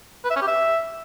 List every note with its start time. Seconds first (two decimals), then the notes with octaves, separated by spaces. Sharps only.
0.24 B4
0.30 E5
0.36 C#4
0.42 G4
0.48 E5